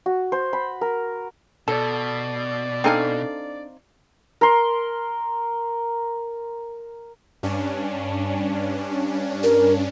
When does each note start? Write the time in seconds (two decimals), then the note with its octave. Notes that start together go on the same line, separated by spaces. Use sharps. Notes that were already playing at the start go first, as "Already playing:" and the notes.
0.06 F#4
0.32 C5
0.53 B5
0.81 A#4
1.68 B2 A4 D5
2.84 C4 D4 D#4 A4 F5 G#5
4.41 A#4 C6
7.43 G2 C#4 D4
9.43 A#4